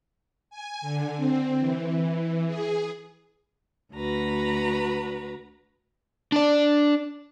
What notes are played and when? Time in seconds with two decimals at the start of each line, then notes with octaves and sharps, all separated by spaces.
0.50 G#5
0.81 D3
1.16 C4
1.58 E3
2.47 G#4
3.93 D2 F#4 B4 A#5
6.32 D4 D5